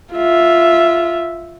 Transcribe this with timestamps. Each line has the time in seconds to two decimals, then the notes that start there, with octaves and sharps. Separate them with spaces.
0.14 F4 E5